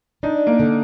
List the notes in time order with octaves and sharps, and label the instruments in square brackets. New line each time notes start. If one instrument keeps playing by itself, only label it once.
[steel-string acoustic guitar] D4 [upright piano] D#4
[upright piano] A#3
[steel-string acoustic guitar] D3